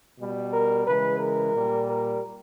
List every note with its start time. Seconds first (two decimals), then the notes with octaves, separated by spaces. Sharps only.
0.17 B2 G3
0.52 A#4
0.85 C#3 E3 G#3 B4
1.19 A#4
1.53 A#2 G3
1.87 A#4